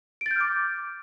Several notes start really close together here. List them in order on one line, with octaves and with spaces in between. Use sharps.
D7 A6 G6 F6 D6